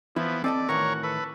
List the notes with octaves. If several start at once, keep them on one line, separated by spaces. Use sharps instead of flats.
E3 F3 B3 E4
C4 A4 D5 D#5 A5
A2 D#3 E3 F#4 A#4 C#5
A4 B4